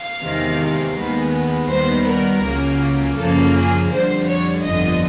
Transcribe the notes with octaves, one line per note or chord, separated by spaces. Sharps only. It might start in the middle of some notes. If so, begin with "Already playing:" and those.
Already playing: F5
E2 C3 D#3 G#3
D#2 D#3 G#3 B3
D#2 D#3 G3 B3 C5
A#4
C#2 C#3 F#3 A#3
F#2 C#3 F3 A#3 A4
G#4
F2 D3 G3 C5
C#5
G1 F2 D3 D#5